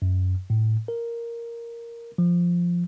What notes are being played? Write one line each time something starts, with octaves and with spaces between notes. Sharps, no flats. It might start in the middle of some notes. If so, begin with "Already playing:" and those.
F#2
A2
A#4
F3